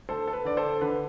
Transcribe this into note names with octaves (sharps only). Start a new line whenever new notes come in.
D2 A4 C5
A4
B4
D3 D5
A4 C5
D3 B4